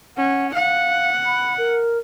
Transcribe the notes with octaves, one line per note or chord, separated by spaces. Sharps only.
C#4 F#5
F5 F#5
B5
A#4